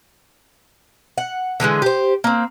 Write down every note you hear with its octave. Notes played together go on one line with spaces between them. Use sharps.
F#5
D3 E3 F#3 G#3
G4 C5
A#3 C4